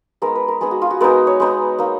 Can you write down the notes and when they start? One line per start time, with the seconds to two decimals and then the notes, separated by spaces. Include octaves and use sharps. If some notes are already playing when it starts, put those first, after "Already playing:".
0.22 G#3 B3 D#4 A#4
0.35 B4
0.48 A#4
0.61 G#3 B3 D#4 G#4
0.71 F#4
0.82 F4
0.91 F#4
1.01 G#3 B3 D#4 A#4
1.27 C#5
1.40 G#3 B3 D#4
1.79 A#3 D#4